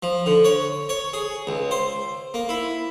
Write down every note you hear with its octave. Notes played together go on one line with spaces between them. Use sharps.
F3
D3
C#5
C#5
G#4
C#2
C5
A#3
E4